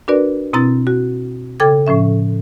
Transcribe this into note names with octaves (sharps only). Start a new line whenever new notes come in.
D4 F#4 A#4 B4 D5
B2 C4 E4 A#5 A6
F#4
C#3 A4 G5 D6 G#6
A2 F3 C#4 E5